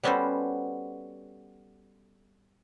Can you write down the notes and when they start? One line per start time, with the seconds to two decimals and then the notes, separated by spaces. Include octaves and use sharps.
0.03 G3 B3 C#4 F#4 A4 C5